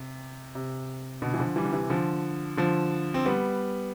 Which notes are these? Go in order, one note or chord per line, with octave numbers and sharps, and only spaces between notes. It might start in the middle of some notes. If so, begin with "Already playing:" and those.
Already playing: C3
C3
B2 D3
E3
D3 F3
E3 G3
D3
C3 E3
D3 F3
D3 F3
C4
G3 B3